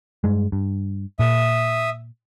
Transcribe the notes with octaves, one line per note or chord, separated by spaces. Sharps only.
G2 G#3
G2
A#2 E5 D#6